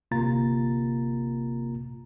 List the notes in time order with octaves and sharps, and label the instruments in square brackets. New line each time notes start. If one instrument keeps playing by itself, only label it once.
[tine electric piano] G1 C3 A#3 F4 A#5 A6